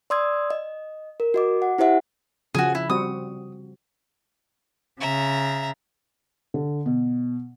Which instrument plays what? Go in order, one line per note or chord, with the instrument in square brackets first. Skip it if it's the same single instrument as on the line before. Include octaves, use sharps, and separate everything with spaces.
[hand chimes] D5 C6 D#6 E6 G#6
D#5
A#4
F#4 D#5 D6
F#5
E4 G4 C5 E5 F#5
[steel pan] C#3 F3 [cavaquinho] F#4 G#4
[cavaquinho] E4
[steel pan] G3 C4 F#4 [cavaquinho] D#6
[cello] C#3 [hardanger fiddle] E5 A#5
[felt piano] D3
B2